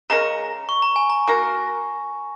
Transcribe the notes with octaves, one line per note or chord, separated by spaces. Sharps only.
C#3 G#3 C#4 A#4 A#5
C#6
A#5
G#5
A#5
A#3 F#4 A#4